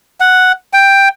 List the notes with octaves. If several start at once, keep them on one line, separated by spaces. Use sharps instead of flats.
F#5
G5